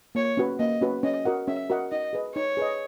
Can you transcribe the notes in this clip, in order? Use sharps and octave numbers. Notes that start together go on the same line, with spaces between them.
A#3 C#5
C#4 F#4 B4
A#3 D#5
C#4 F#4 B4
C#4 D#5
F#4 A#4 D#5 F#5
C#4 E5
F#4 A#4 D#5 F#5
D#4 D#5
G#4 B4 D#5
D#4 C#5
G#4 B4 D#5